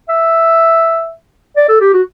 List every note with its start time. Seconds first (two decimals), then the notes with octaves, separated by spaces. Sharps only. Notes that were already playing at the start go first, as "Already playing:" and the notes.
0.09 E5
1.57 D5
1.69 A4
1.81 G4
1.94 F#4